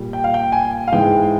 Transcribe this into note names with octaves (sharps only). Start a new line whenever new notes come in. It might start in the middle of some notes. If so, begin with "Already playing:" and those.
Already playing: A#2 G3
G5
F5
G5
G#5
F5
G#2 E3 G#3 G5